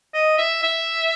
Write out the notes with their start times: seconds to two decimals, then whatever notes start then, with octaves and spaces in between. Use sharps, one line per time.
0.14 D#5
0.38 E5
0.62 E5